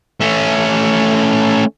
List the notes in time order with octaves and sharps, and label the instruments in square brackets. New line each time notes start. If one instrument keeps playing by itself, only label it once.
[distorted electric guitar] A3 C#4